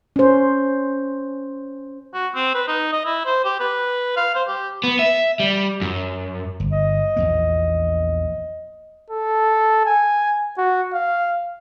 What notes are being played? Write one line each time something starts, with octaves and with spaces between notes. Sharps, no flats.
C#4 C5
F#4
C4
B4
D#4
D#5
E4
C5
G4
B4
F5
C5
G4
B3
E5
G3
F#2
G1
D#5
A#1 E2 A#3
A4
G#5
F#4
F5